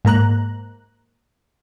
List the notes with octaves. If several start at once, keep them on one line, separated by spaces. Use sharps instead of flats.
G#2 A#3 A#5 F#6